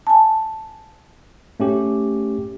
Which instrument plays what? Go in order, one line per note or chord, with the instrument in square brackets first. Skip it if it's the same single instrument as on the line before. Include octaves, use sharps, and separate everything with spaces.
[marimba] G#5 A5
[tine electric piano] A3 C#4 G4